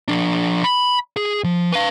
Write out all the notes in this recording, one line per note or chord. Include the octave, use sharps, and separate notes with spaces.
F3 D4
B5
G#4
F3
B4 F5